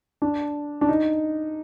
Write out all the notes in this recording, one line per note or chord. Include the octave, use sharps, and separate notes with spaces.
D4
D4
D#4